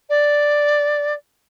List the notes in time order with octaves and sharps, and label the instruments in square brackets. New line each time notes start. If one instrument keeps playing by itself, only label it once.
[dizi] D5